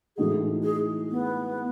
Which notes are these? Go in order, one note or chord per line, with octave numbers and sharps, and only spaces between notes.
A2 E3 G#3 D#4 F#4 G#4
G#4
B3